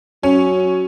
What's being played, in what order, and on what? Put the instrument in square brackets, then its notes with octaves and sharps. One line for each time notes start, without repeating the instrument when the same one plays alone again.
[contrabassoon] F#3 [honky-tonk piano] C#4